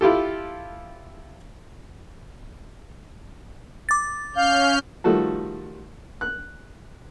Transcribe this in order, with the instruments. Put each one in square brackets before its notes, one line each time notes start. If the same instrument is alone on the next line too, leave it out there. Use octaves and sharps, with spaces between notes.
[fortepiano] E4 F4 G4 A4
[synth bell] D6 A6
[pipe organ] C#4 F6 G6 [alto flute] F5
[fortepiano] D#3 F3 G3 A3 F#4 A4
F#6